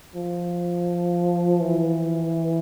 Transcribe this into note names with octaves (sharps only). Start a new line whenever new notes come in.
F3
E3